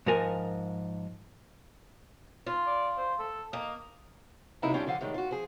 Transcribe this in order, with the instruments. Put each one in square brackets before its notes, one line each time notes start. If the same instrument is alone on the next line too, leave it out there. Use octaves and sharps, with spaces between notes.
[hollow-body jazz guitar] G#2 F3 A#4 G#5
[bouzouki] F4
[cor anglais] D5
C5
A4
[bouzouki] A#3 [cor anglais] D#5
[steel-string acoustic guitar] F#2 C3 G#3 A#3 D#4 E4
G3 C#4 D4 E4 F4 G5
D3 F3 F5 F#5
A2 D#3 G3 G#3
F4 F#4
F3 G#4